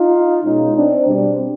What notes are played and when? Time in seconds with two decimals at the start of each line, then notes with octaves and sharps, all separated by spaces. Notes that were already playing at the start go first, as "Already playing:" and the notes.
Already playing: D#4 F4
0.44 B2 G#3 C#4 D#4
0.75 C4 D4
1.06 B2 G3 C4 D4